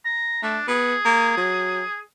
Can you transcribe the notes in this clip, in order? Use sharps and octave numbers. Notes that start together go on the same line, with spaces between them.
A#5
A3 D4
B3 G#4
A#3
F#3